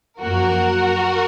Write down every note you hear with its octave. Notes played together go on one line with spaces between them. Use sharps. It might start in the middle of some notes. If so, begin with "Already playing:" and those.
F#2 F3 A#3 F#4 A#4